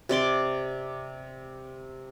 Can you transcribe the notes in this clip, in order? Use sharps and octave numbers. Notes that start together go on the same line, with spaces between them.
C3 D5 C6 D6